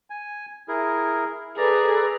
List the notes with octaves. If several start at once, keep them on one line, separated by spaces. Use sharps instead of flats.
G#5
E4 G#4 A#4
G#4 A4 B4 D5 A#5